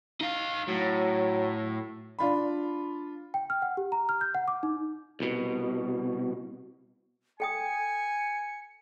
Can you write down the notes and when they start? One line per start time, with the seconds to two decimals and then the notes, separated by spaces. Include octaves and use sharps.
0.21 D#4 F5
0.68 A2 F#3
2.19 D4 F4 B5
3.34 G5
3.50 F6
3.62 F#5
3.77 G4
3.92 A#5
4.09 F6
4.21 G6
4.35 F#5
4.48 D6
4.63 D#4
5.20 C2 B2
7.40 A4 G5 G#5 D#6 C#7